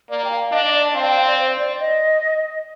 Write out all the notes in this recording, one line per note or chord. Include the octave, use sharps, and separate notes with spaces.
A#3 D5
G5
F5
D4 D#5
D#5
D5
C4 F5
G5
F5
D5
C5
D5
D#5